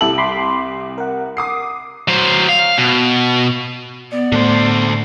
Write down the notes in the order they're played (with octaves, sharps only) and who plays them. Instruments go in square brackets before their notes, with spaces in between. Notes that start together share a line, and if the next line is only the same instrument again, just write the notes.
[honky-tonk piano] C2 G4 F#7 [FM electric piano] E4 A4
[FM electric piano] B5 C6 D6
A#4 F#5
[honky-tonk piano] D6 D#6 C7
[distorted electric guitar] F#3 C5
F5
B2
[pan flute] B3 [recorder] D5
[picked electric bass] A2 A3 [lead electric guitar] D3 C5